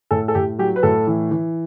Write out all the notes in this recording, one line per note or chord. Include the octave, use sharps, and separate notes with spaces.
A2 A4
A4
A2 G4
F#3 G4
B4
A2 A4
E3
E3